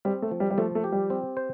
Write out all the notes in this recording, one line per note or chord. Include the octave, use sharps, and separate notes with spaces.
G3 C4
A3
F3
G3
G3
F3 A3
A3
G4
G3
C4
C5